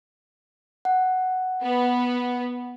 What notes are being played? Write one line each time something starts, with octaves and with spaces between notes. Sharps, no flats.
F#5
B3